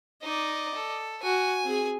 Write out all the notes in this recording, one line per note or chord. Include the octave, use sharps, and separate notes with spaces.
D#4 D5 D#5
A4
F#4 G#5
C4 G#4